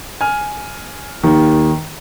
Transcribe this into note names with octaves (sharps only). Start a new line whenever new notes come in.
G#5 F6
D#2 D#3